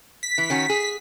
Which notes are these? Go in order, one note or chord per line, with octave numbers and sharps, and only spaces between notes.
B6
E3
D#3 C#4 F#4
G#4